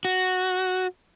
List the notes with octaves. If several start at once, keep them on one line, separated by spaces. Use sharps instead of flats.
F#4